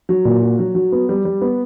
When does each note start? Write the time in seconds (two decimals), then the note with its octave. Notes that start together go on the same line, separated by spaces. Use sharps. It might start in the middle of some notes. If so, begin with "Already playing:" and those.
0.09 F#3
0.25 A#2
0.42 F#4
0.59 F#3
0.75 F#3
0.92 B3
1.09 G3
1.25 G3
1.41 B3